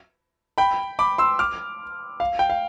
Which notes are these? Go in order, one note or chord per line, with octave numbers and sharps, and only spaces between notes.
G5 B5
B5 D6
C6 E6
D6 F6
F5
G5
F5